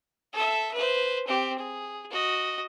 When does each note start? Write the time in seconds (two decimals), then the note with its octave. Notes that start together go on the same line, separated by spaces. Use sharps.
0.33 A4 E5
0.74 B4 C5
1.27 C4 G4
1.58 G#4
2.11 F#4 D#5